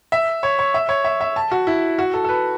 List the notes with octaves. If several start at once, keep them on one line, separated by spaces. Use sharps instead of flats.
E5
C#5
C#5
E5
C#5
E5
E5
A5
F#4
E4
F#4
A4
A4
B4